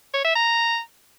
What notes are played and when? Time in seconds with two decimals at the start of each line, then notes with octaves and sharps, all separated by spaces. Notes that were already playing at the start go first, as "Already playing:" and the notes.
0.14 C#5
0.25 E5
0.36 A#5